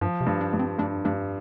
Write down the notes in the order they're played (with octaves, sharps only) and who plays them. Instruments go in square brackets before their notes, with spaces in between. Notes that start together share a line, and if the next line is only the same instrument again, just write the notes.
[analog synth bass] G2 [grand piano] F3
[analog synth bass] C3
[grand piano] G2
[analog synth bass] D4
[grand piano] G2
[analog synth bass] C4
[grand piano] G2 [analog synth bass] D4
[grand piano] G2 [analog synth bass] D4